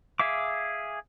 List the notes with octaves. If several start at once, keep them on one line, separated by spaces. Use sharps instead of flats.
G#4 E5 F5 D6